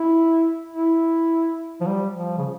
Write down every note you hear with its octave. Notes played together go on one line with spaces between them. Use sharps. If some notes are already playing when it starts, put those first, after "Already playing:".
Already playing: E4
E4
F3
G3
F3
C#3